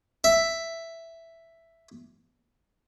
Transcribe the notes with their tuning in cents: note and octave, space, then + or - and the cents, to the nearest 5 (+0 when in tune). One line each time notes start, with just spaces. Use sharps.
E5 +5